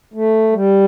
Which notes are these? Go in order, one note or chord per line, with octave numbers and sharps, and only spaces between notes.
A3
G3